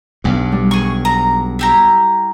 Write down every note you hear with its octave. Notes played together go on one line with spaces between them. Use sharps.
B1 G2
G3
G#4 C#6
A#5
E4 G4 A#5